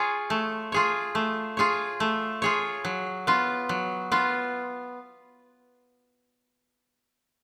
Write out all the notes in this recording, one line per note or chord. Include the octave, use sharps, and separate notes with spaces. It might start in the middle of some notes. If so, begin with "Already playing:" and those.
Already playing: F4 G#4 C#5
A3
F4 G#4 C#5
A3
F4 G#4 C#5
A3
F4 G#4 C#5
F#3
B3 F4
F#3
B3 F4